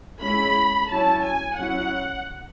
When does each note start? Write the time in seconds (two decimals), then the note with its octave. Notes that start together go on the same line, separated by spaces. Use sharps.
0.21 G#3 C#4 E4 B5
0.90 F#3 C#4 E4 A5
1.24 G#5
1.57 F#3 C#4 E4 F#5